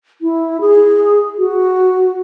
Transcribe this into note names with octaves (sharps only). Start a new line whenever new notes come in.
E4
G#4
F#4